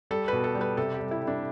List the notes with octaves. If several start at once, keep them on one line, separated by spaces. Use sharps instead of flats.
G3 A4
B2 B4
A4
G3
B4
C3 A4
G4
G3
E4
G3
D4